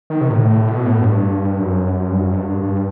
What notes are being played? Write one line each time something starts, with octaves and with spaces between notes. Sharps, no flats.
D#3
C3
A2
B2
A2
G2
F#2
G2
F#2
G2
G2
G2